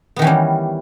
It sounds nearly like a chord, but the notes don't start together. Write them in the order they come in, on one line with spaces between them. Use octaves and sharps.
B3 D#3 E3 C#4 G3